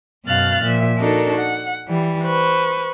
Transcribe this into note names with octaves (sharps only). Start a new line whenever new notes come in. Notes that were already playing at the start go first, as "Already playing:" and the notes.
F#2 B2 F5 F6 F#6 A6
A#2 F3 E5
D4 D#4 F#4 A4 A#4
F#5
E3 G3
B4 C5 C#6